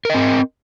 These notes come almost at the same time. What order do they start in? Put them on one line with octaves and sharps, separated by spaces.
A#4 D#5 C4